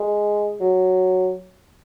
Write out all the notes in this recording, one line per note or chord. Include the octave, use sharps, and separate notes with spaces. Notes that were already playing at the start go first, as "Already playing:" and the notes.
Already playing: G#3
F#3